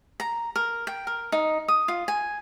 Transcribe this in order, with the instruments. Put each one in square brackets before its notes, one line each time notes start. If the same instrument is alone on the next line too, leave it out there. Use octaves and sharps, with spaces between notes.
[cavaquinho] A#5
A#4
G5
A#4
D#4
D#6
F4
G#5